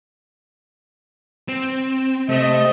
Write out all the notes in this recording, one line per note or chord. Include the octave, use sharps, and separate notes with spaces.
C4
C3 A3 C4 D#5